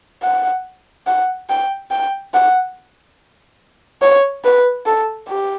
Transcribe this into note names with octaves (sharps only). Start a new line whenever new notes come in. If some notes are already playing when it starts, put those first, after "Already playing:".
F#5
F#5
G5
G5
F#5
C#5
B4
A4
G4